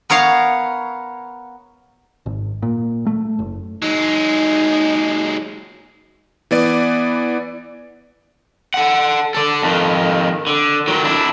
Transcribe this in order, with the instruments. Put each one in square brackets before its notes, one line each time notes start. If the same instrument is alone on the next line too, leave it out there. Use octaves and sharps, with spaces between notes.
[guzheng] B3 A#4 C#5 F5
[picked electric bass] G#1
A#2
A3
F#1
[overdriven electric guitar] F#3 G#3 [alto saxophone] D#4
[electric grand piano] E3 B3 D5
[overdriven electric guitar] A4 F#5
A4 D5
F2 D#3
D3
D#3 F#3
D4 E4